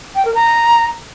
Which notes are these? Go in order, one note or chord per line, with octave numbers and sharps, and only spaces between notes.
G5
A#4
A#5